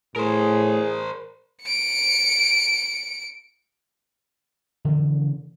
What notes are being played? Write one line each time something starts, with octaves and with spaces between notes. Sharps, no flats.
A2 G#4 A#4 C5
C#7 D7
C#3 E3 F3 A#3